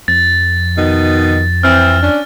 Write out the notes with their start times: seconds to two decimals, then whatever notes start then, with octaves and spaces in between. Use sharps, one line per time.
0.08 F2 A6
0.76 B2 D#3 D#4
1.63 E3 C4 F6
2.02 C#4 D4